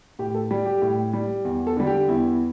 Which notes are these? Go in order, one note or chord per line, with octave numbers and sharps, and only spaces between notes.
A2 G4
A4
G3 G4
G4
A2
G3
E2
A4
D3 G3
G4
E2 E4